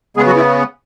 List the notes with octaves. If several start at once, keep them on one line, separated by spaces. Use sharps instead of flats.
C#3 G#3 B3 G#4
F#3 F#4
E4